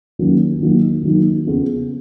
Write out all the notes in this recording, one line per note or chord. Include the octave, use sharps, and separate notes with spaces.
D#3 F#3 A#3 C#4
D#3 F#3 A#3 D#4
D#3 F#3 A#3 D#4
C#3 F3 B3 F4 G#4